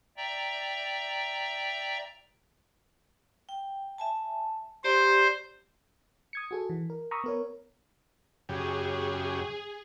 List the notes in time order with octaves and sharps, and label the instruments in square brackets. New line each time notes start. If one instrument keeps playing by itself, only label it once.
[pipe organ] D5 E5 G5 A#5
[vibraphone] G5
E5 G#5 A5
[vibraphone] G4 D5 A#5 [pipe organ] C5
[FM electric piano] D#6 G#6 C#7
F#4 G#4 A4
E3
A#4
A#5 B5 C#6 D#6 E6
B3 A#4 C#5
[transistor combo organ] F#2 C#3 G4 [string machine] G#4